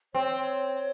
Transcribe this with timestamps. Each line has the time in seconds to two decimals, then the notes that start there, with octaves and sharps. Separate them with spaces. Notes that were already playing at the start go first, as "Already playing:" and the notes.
0.14 C4 C#5